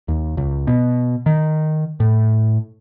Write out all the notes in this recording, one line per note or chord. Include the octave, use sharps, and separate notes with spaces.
D#2
C#2
B2
D#3
A2